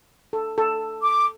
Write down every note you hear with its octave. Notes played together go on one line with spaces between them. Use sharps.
A4
A4
D6